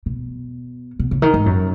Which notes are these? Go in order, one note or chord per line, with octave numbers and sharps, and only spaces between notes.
B2
B2
C#3
D#3
G#2
F#2